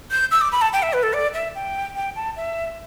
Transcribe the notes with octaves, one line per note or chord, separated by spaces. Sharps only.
G6
E6
D6
B5
A5
G5
E5
B4
A4
D5
E5
G5
G5
A5
E5